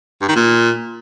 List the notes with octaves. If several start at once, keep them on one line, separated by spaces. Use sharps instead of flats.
G2
D#3
A#2